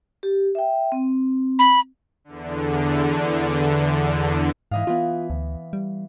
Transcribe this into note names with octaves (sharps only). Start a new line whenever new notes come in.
G4
E5 G5
C4
B5
E2 D3
G#2 E3 D#5 F5
E3 B3 F4
D2
G3